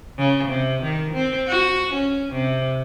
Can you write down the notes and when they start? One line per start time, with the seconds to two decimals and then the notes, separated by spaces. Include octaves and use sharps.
0.18 C#3
0.49 C3
0.83 D#3
1.13 C4
1.48 F#4
1.93 C#4
2.33 C3